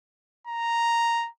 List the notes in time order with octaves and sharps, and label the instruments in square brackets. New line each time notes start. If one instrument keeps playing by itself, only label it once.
[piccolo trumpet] A#5